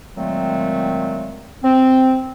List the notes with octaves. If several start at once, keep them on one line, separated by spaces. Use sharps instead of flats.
A#2 D#3 F#3 G#3 A3 C4
C4